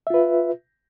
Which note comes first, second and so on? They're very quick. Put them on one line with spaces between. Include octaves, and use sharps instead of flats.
E5 F4 B4